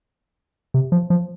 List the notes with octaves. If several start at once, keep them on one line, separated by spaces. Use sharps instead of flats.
C3
F3
F3